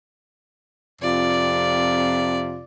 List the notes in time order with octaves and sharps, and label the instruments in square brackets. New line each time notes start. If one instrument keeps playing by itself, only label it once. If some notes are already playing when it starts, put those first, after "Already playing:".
[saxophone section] F2 C3 F4 [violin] D5